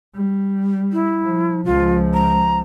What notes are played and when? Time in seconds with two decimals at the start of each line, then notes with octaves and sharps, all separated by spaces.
0.15 G3
0.93 E4
1.23 F3
1.65 C#2 F3 F4
2.14 A#5